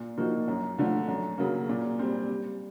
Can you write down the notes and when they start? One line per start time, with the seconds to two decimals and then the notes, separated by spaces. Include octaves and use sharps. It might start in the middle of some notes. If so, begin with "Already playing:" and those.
Already playing: A#2
0.18 F3 A#3 D#4 F#4
0.48 F#2
0.78 D3 F3 A3
1.08 F#2
1.38 C#3 F#3 A#3
1.69 A#2
1.99 G3 C4
2.29 G3